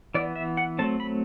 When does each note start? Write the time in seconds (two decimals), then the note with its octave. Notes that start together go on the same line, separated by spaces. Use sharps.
0.14 E3 B3 D5
0.36 E5
0.57 F#5
0.79 F#3 A3 C4 A5
1.00 B5